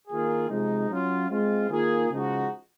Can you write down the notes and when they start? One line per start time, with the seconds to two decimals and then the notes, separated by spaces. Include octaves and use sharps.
0.08 D#3 A#3 F4 G#4
0.49 C3 F3 G#3 D#4
0.89 F#3 C#4 F4
1.29 G#3 C4 F4
1.69 D#3 A#3 F4 G#4
2.10 C#3 F3 G#3 D#4 F#4